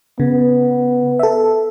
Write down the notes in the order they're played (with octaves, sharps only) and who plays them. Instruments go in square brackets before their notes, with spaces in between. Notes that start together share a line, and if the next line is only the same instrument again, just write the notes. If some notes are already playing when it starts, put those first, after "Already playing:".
[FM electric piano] C#3 [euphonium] B3
[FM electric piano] A4 E5